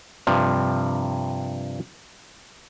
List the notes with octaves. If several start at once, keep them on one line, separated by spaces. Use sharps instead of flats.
G2 C3 F3